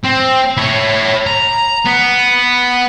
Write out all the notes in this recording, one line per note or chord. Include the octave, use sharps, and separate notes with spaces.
C4
E4 C#5
A#5
B3